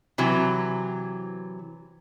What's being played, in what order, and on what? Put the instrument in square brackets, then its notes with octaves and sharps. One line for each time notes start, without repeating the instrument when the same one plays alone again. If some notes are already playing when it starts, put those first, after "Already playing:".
[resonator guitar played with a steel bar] C3 E3 F#3